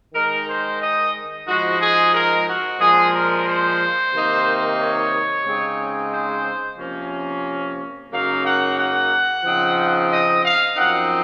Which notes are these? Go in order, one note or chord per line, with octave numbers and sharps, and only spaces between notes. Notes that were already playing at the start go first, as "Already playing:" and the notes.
D#3 G#3 D#4 A#4
C5
D#5
G#2 F3 G#3 D#4 F#4
G#4
A#4
F#4
A#2 F3 G#3 G#4
A#4
C5
C3 D#3 A#3 D#4
C#5
C#3 G#3 C4 D#4
C5
C3 F3 A#3 C#4
F#2 C#3 F#3 A#3 D#4 F5
F#5
F#5
C#3 F3 C4 D#4
D#5
F5
F#2 F3 C4 D#4 F#5